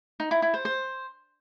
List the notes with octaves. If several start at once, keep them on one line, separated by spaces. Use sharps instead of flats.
D#4
E4
E4
C5
C5